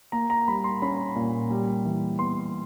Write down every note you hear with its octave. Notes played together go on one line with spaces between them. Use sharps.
A#3 A#5
A#5
G3 B5
C6
C#4 B5
A#2
G3
E3
B3 C6